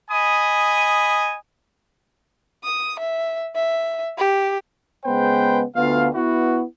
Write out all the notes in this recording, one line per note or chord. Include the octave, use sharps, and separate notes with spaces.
D#5 G#5 B5 D#6
D#6
E5
E5
G4
C#3 G#3 B3 B4 C5 G5
D2 D3 B3 F4 F5
B3 E4 F#4